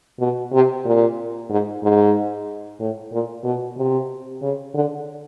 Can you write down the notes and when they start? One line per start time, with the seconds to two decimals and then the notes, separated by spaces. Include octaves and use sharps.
0.20 B2
0.52 C3
0.85 A#2
1.50 G#2
1.83 G#2
2.80 A2
3.12 A#2
3.44 B2
3.77 C3
4.42 C#3
4.74 D3